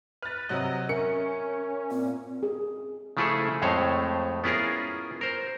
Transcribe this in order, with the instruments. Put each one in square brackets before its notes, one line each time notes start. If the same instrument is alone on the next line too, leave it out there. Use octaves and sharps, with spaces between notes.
[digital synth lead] B4 [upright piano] F6 A6
[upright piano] C3 F#3 F#6 [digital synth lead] D#5
[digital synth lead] C#4 [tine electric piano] A#4 E5 [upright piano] C#7
[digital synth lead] A#2 [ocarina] C4
[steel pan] G#4
[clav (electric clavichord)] C#3 F3 A3 E4 G#4 A4
F2 A2 G#3 A3 C5 C#5
B3 C#4 E4 F4 G#4 A#4
A#4 C5